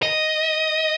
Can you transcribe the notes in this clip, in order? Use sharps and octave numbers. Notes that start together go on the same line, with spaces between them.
D#5